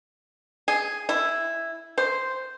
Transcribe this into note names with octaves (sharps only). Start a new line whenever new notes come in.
G#4
E4
C5